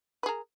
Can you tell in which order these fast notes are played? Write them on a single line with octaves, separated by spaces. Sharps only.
B4 G#4 A#4